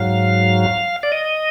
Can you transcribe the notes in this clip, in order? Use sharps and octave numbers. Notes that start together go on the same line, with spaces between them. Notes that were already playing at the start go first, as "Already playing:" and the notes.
Already playing: G#2 F#3 F5
D5
D#5